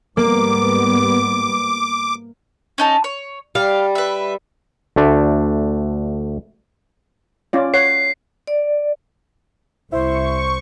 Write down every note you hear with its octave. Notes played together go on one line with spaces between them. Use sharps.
G#2 G3 A#3 B3 D6
C#4 D#4 A5
C#5
G3 F5
B4 E5
D2 A3 D4
C#4 F4 D5
C#5 F#5 C7
D5
C2 E4 C5 C#6